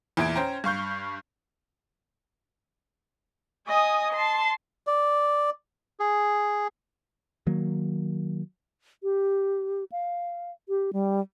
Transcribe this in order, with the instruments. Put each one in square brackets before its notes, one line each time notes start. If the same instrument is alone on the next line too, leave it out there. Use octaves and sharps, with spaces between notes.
[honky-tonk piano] E2 A#2 E4 G#6 D7
C#4 C5 G5 A#5
G2 F5 C#6 G6
[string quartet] D#5 G#5 D#6
A5 C6
[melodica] D5
[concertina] G#4
[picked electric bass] D#3 F#3 A#3
[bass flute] G4
F5
G4
G3